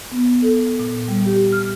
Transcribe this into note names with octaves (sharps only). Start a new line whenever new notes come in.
B3
A4
A#2
G3
G4
F6